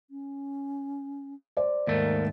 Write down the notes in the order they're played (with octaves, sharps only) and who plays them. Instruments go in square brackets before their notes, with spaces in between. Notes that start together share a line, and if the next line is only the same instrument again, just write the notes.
[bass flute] C#4
[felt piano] C5 D5
[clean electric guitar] D#2 G#2 A3 [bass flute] A#4